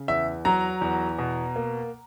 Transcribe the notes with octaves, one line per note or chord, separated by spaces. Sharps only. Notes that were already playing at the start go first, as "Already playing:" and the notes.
Already playing: C#3
E2 E5
F#3 A#5
E2
B2
A#3